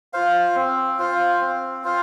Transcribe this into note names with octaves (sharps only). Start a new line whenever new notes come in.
F4 C5 F5
C4
F4 C5 F5
C4
F4 C5 F5